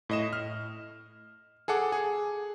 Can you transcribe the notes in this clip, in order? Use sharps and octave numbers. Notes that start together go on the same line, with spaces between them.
A2 D#5 E7
F6
G#4 A4 F#5 D6
G#4